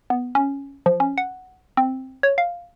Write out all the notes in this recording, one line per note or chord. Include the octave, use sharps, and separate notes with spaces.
B3
C#4
F3
C#4
F#5
C4
C#5
F5